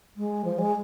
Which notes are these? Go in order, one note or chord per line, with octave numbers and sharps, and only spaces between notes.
G#3
F3
G#3